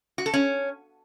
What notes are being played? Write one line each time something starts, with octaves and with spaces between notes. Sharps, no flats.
F#4
A4
C#4